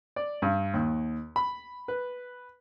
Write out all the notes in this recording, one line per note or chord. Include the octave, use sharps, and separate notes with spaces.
D5
G2
D#2
B5
B4